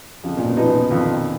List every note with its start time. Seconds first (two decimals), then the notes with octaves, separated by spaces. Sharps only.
0.24 F2 C#3
0.37 A#2
0.45 B2
0.57 F3 B3 D#4
0.68 B2
0.90 F2 D#3